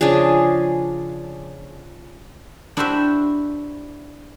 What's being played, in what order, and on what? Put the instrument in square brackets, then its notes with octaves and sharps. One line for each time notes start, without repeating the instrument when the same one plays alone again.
[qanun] C#3 F3 D4 G#4
[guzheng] D4 E4 F#4 G4 C5 E5